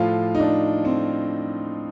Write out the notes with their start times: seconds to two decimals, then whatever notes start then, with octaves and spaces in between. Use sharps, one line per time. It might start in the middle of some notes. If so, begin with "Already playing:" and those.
Already playing: A2 F3 F4
0.35 D#4
0.39 D4
0.85 C4